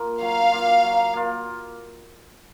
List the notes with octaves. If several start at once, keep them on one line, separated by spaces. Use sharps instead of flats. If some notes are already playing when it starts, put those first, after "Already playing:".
Already playing: A#3 F4
F#3 F5
A#3 F4
F#3
A#3 F4